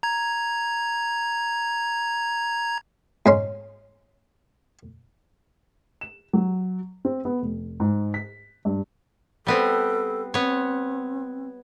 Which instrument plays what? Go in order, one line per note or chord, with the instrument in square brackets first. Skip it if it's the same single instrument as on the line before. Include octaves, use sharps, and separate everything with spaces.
[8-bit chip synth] A#5 G#6
[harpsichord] G#2 C#4 C6
[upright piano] E7
F#3
C4
B3
F1
G#2
B6
G2
[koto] G3 B3 C4 [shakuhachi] A4
[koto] B3 C#5 [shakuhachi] C4